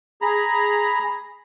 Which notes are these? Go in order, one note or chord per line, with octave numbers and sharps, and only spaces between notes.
G#4 A#5 B5